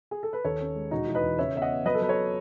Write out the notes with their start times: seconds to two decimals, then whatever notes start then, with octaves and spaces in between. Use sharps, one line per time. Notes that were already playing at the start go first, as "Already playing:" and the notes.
0.11 G#4
0.23 A4
0.33 B4
0.45 D#2 A4 C#5
0.60 C#4
0.75 G#3
0.91 E1 D#4 F#4
1.08 E3
1.15 B4 D#5
1.23 E2
1.38 C#3 C#5 E5
1.54 B3 E5
1.62 D#5 F#5
1.70 B3
1.85 F#3 B4 D#5
1.95 A4
2.01 F#3 B4
2.09 A4 C#5